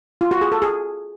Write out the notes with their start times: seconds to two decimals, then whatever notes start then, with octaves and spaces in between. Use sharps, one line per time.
0.21 F4
0.31 F#4
0.41 G#4
0.52 A4
0.62 G#4